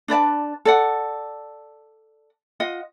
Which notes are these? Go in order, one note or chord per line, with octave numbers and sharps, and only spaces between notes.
D4 B4 D5 A5
A4 D5 F#5
F4 D#5 F#5